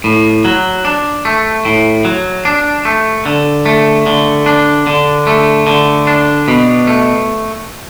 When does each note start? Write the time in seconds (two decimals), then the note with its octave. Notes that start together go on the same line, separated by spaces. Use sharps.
0.04 A2
0.45 F#3
0.85 D4
1.25 A3
1.65 A2
2.05 F#3
2.45 D4
2.85 A3
3.26 D3
3.66 A3
4.06 D3
4.46 D4
4.87 D3
5.27 A3
5.67 D3
6.07 D4
6.48 B2
6.87 A3